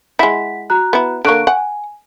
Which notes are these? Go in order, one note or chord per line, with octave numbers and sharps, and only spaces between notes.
G#3 E4 F#5 B6
F#4 A#5 F#6
B3 E4
D3 A#3 C#6 F#6 D7
F#5 G#5